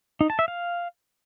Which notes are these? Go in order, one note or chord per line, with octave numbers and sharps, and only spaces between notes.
D#4
A5
E5
F5